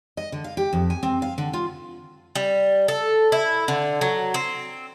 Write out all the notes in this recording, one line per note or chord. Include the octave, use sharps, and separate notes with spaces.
D#5
D3
F5
G4
F2
G#5
C4
F5
D3
F4
G3
A4
E4
D3
F#3
C4